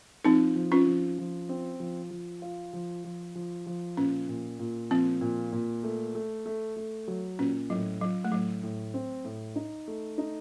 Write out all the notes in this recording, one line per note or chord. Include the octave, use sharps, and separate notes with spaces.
F3 C4 D#4
F3
C#4 F4
F3
F3
C4
F3
F3
F4
F3
F3
F3
F3
A#2 C#4
A#2
A#2
F3 C4
A#2
A#2
A3
A3
A3
A3
F#3
A#2 C#4
A2 F#3
F#3 F4
A3
A2 F#3
A2
C4
A2
D#4
A3
D#4